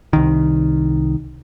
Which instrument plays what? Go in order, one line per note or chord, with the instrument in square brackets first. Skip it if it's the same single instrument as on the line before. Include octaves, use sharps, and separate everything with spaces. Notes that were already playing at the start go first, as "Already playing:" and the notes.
[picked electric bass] C2 D#3